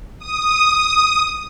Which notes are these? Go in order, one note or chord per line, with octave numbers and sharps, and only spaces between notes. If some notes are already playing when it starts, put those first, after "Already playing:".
D#6